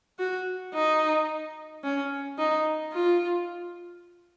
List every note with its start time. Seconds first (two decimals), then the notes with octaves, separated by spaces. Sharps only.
0.19 F#4
0.74 D#4
1.84 C#4
2.38 D#4
2.93 F4